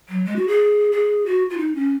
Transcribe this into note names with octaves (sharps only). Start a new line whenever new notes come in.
F#3
G#3
F#4
G#4
G#4
F#4
F4
D#4
C#4